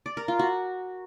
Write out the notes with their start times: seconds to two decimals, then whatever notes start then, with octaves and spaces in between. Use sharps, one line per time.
0.06 D5
0.17 A#4
0.28 F4
0.39 F#4